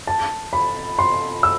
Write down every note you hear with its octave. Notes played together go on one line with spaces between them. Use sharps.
A5
B5
C6
E6